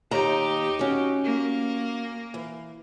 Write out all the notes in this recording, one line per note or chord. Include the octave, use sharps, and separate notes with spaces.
D#2 D#4 G4 A#5
C#4 F#4
A#3
E3